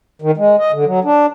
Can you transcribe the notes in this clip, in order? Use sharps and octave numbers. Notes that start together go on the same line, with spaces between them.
D#3
G#3
D#5
D3
F#3
D4